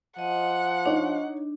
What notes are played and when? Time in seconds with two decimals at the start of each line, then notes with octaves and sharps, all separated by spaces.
0.19 F3 D#5 F#5
0.85 D4 D#4 C#5